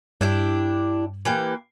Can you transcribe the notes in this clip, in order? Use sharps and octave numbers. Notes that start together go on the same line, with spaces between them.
G2 D4 E4 G4
E3 A#3 G4